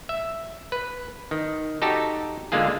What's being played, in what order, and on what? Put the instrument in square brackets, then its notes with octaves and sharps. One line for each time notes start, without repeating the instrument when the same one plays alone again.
[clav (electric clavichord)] E5
B4
D#3
D#4 F#4 G4 A4 A5
D3 G#3 A#3 F4 G#4